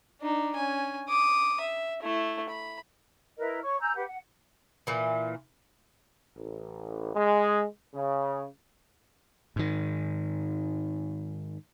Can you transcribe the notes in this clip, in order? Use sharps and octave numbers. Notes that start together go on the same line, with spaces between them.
D4 D#4
C#4 G#5
D6 D#6
E5
A3 E4
B5
E4 A#4 B4 D#5
C#5 C#6
G#5 A#5 E6 G6
G4 B4 F#5
F#5
A#2 E3
A1
G#3
C#3
G#2 D#3